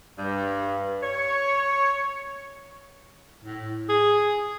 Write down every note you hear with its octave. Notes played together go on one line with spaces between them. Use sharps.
G2
C#5
A2
G#4